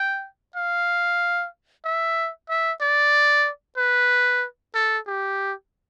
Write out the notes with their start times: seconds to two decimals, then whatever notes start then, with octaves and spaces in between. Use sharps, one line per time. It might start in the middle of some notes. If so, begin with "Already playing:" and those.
Already playing: G5
0.56 F5
1.85 E5
2.49 E5
2.81 D5
3.77 B4
4.75 A4
5.07 G4